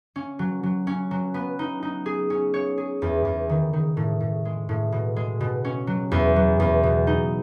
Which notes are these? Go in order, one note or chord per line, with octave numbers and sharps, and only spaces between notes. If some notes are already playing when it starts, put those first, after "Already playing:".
C#4
F#3
F#3
C#4
F#3
B3
D#4
D#4
G#4
C#4
C#5
G#4
E2
E2
D#3
D#3
A2
A2
G#3
A2
B2
G#3
B2
C#4
F#3
E2
F#3
E2
B2
D#4